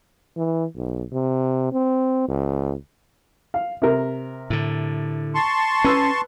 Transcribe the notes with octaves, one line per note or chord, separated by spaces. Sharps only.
E3
B1
C3
C4
C#2
F5
C3 A#4
A2 D3
A5 C6 C#6
C#4 B4 E6